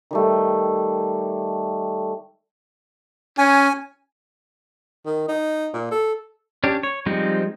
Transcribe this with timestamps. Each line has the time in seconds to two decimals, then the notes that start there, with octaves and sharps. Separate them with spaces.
0.11 D#3 G3 A3
3.38 C#4 G#5
5.06 D#3
5.28 D#4
5.74 A#2
5.91 A4
6.64 C#4 D4 G4
6.83 C#5
7.06 F3 G3 G#3 C4 D#4